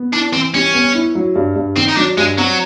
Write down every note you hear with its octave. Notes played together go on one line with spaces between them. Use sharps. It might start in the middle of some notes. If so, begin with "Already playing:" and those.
Already playing: B3
D4 E4
E3 C4
G3 C#4
B3
E4
F#3
G2
G2
D#3 C4
D#4
F#3 D4
G2 G#3
F#3 C4